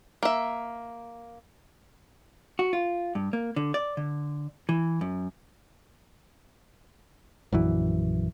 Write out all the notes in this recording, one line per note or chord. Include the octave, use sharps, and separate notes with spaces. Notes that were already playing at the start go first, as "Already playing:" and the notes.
A#3 E5
F#4
F4
G2
A#3
D3
D5
D3
E3
F#2
A#1 F#2 E3